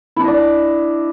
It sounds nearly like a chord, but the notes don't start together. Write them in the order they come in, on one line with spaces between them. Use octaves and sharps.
E4 D4 D#5 D5